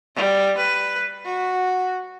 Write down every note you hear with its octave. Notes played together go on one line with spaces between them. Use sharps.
G3
B4
F#4